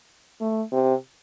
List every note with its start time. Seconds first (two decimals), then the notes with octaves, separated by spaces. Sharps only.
0.41 A3
0.72 C3